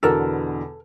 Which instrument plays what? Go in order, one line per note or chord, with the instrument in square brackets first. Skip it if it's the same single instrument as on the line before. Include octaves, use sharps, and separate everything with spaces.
[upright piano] E2 B2 D3 [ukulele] A4 A#4